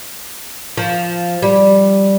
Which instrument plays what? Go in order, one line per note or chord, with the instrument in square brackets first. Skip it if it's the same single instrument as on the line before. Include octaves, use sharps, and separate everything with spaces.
[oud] F3
G3